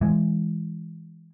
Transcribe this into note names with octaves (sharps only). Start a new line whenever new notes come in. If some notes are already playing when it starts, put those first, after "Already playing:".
E3 G#3